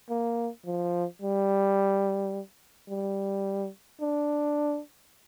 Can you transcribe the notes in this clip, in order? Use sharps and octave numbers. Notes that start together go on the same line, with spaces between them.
A#3
F3
G3
G3
D4